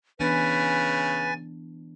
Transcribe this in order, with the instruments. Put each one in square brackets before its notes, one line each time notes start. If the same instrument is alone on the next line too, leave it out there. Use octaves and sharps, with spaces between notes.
[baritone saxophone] C#3 [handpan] E3 B3 D4 [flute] B4 [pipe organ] G#5 A6